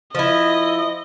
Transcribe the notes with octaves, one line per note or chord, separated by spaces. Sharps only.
F3 E4 D#5